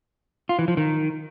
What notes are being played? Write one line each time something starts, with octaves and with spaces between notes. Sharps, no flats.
F4
E3
F3
D#3